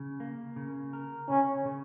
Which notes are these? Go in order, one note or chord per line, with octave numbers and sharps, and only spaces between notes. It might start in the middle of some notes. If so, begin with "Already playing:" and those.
Already playing: C#3
A#3
C#3
A#4
C#3 C#4
C#3